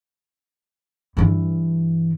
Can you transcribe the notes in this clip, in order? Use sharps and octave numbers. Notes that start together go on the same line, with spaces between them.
G2 E3